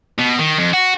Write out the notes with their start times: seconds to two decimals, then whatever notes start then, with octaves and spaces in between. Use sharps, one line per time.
0.19 B2
0.39 D#3
0.59 F2
0.74 F#4